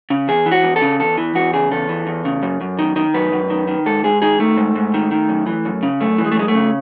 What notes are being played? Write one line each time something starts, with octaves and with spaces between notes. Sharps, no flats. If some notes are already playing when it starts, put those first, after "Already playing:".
C#3
E2 G#4
E3
F#4
E2
A4
C#3
E2 A4
E3
E2 F#4
C#3 G#4
E2 A4
E3
E2
C#3
F#2
F#2
D#3
D#3
F#2 B4
F#2
D#3
D#3
G#2 A4
G#2 G#4
D#3 G#4
D#3 A3
G#2
G#2
D#3
D#3
F#2
E3
F#2
C#3
F#2 A3
E3
G#3
A3
F#2 G#3
A3
C#3